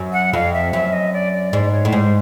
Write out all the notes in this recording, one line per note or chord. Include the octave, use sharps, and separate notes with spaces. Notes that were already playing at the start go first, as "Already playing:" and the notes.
Already playing: F#2
F#5
F2 F5
E5
F#2 E5
D#5
D5
D5
G#2 D5
D5
C#5
A2
G#2 C5